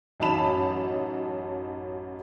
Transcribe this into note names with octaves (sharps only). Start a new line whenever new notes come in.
A1 F#2 D#4 A5 B5 E7